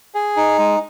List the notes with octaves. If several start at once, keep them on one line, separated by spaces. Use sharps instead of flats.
G#4
D#4
G#3